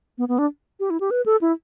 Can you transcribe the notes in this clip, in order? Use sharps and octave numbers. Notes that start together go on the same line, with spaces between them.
B3
B3
D4
G4
E4
G4
B4
A4
E4